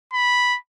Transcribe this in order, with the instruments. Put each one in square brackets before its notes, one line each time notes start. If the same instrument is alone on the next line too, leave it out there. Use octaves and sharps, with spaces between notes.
[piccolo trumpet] B5